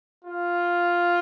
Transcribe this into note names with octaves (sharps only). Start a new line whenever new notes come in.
F4